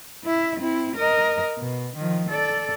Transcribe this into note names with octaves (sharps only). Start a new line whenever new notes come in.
E4 E5
C4 E4
A#4 D#5
B2
D#3 F3
A4 D5